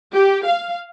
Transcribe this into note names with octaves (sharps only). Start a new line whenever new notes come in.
G4
F5